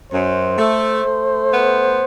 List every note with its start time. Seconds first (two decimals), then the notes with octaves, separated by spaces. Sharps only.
0.11 F#2 C5
0.58 A3
1.04 A3
1.50 B3